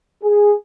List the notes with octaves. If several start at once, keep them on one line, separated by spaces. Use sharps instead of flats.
G#4